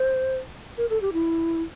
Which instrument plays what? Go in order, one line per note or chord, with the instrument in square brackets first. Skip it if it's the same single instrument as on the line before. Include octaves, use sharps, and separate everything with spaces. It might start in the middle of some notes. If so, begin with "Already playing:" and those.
Already playing: [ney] C5
A#4
A4
G4
E4